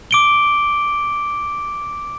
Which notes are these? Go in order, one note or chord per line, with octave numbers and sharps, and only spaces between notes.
D6 D7 G7